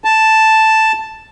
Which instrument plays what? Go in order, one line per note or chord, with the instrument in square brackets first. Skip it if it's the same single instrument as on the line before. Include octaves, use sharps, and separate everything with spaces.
[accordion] A5